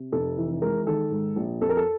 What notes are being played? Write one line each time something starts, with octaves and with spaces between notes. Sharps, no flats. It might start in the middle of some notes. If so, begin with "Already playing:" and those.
Already playing: C3
F1 A4
E3
G#3 A#4
D#3 A4
G#2
A#1
F2 A4
A#4
A4